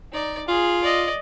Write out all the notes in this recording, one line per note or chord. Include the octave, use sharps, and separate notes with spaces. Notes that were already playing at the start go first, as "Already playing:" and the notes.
D#4 D5
F4 G#4
D5 D#5